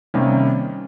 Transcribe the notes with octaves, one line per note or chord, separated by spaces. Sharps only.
C3 D#3 G3 A#3 C#4